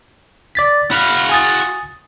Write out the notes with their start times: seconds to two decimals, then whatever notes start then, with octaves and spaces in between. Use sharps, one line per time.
0.55 D5 A6 B6
0.91 F#4 F5 B5
1.29 G#5 D#6 A6